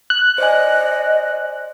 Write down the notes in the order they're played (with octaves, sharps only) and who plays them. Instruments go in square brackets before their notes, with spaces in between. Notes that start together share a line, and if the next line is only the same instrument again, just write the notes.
[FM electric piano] F#6
[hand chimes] C5 D5 G#5 [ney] D#5